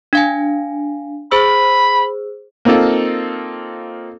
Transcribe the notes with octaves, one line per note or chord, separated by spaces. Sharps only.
D4 F5 G#5
G#4 C5 B5 E6
A#3 C4 D#4 F4 A4